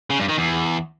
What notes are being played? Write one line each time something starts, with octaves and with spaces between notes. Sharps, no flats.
C#3
G2
D#3
E2